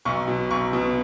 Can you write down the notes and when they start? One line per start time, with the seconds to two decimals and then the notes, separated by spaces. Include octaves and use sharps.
0.05 B1 C#6
0.28 B2
0.51 B1 C#6
0.73 B2